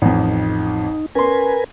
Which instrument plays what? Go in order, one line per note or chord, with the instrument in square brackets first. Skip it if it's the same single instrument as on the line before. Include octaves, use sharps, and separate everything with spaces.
[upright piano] A1 F2 [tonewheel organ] D#4
[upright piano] C#4 C6 [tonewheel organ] A#4 B4 G#5